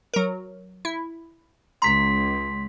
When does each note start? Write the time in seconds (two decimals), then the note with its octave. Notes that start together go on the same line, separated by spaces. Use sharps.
0.14 F#3 A#4
0.85 E4
1.82 C#2 A#5 C6 B6